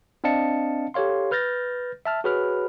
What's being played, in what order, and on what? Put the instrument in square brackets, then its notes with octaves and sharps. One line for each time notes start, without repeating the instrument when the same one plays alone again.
[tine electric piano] C4 D4 D#5 F5 A5 C#7
G4 A4 C#5 F5 C6
B4 F6 G6 A6 A#6
E5 A5 F6
F#4 G#4 B4 C#5 B5 F6